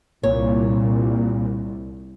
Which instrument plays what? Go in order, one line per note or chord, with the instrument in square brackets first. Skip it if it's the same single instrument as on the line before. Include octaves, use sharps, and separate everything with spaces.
[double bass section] C2 [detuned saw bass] A#2 [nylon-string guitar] C#5